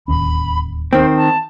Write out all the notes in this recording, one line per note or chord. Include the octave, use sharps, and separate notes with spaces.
D1 D#2 C#4 B5
D#3 C4 C5
A5